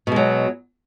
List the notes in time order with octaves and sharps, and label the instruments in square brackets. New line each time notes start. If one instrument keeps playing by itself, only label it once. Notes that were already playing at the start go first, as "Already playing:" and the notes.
[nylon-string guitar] B2
G#3
F#3